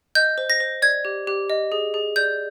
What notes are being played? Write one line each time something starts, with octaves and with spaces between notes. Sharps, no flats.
D#5 G6
C5
A#6
C5
D5 G#6
G4
G4
D#5
G#4
G#4
D5 G6